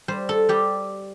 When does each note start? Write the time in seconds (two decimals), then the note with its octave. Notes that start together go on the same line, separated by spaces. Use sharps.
0.08 G3 C5
0.29 A4
0.49 G3 G4